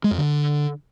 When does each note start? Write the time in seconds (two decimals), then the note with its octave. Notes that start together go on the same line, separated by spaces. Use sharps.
0.04 G#3
0.11 F2
0.18 D3